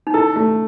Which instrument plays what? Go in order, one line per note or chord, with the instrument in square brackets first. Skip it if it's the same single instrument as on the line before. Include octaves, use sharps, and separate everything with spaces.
[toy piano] D#4
[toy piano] E4 [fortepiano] A4
[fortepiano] A3